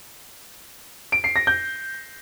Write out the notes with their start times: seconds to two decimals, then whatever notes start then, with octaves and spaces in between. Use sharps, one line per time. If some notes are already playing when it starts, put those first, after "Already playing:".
1.12 D7
1.24 C7
1.36 A#6
1.47 G6